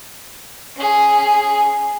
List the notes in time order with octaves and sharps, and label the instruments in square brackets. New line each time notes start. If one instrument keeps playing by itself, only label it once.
[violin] C#4 G#4